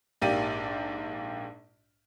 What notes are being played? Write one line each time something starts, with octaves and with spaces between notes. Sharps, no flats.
A#1 G#2 A#3 G4 D5 D#7